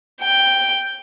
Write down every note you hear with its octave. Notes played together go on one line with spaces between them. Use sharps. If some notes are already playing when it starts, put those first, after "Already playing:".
G5